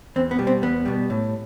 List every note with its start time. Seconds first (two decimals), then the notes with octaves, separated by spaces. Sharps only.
0.16 E2 C4
0.31 B3
0.38 B2 G3
0.47 C4
0.62 E2 B3
0.85 B2 G3
1.10 A2